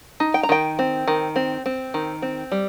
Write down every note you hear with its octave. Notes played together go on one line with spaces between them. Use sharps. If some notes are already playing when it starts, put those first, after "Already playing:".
D#4
G5
A#5
D#3 G5
C4
D#3
C4
C4
D#3
C4
G3